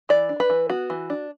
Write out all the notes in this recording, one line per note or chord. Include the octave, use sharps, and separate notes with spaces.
E3 D5
D4
B4
E3
B3 F#4
E3
D4